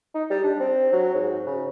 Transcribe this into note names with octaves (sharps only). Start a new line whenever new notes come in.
D#4
G3
D4
C4
F#3
G#2
C#3